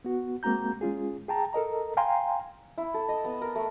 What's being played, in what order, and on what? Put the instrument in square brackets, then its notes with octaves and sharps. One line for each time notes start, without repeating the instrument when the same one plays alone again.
[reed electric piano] B3 F#4
G#3 A#3 C4 F#4 A#5 G6
G#3 C#4 F4 G#4
G#4 G5 A5 A#5
A4 A#4 D#5 A#5
F5 G5 G#5 A#5 C6
[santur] E4
A4
D#5
B3
A#4
A3